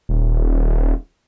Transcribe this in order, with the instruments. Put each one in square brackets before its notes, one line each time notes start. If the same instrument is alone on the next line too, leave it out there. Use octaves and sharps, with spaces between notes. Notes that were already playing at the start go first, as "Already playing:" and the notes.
[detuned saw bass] D#1